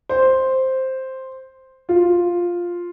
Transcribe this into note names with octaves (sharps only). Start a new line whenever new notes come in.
C5
F4